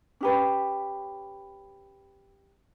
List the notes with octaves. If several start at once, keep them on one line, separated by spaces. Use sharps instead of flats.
C#4 G4 B4